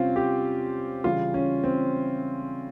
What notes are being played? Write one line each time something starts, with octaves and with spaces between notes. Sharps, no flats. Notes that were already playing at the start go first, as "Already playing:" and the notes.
Already playing: C3 G3 C4 C#4 F4
G4
C#3 E3 G3 F4
C#4
C4